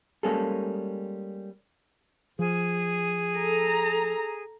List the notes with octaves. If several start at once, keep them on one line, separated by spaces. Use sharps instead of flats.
G3 G#3 A#3 C#4 G#4 A4
F3 G#4
A4 A#5